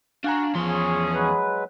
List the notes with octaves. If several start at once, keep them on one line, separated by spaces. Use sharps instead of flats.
D4 F#4 F5 G#5 A#5
E2 F3 C#4 G#4 C6
F#3 G#3 B4